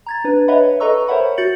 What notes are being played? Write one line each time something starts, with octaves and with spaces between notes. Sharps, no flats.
A#5 G#6 A6
D4 B4
B4 C#5 D#5 E5 F#5 B5
A4 B4 D#5 A#5 C#6 E6
A#4 C5 C#5 E5 F#5 B5
F#4 G6 A6 C#7 F#7